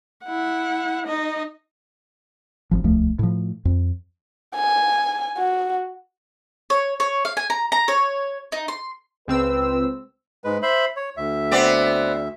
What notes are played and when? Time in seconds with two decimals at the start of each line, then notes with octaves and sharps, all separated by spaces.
0.25 E4 F#5
1.07 D#4 D#5
2.71 G#1 F3
2.84 D#1 C#2 F3 A3
3.19 A2 F3
3.65 F2
4.56 G#5
5.38 F#4
6.70 C#5
7.00 C#5
7.25 F5
7.37 G#5
7.50 A#5
7.72 A#5
7.88 C#5
8.52 D#4
8.68 C6
9.28 C#2 C4 B4 E6
10.44 G#2 G#3 B4
10.62 C5 E5 B5
10.96 C#5
11.17 D2 E5
11.51 B3 C4 D5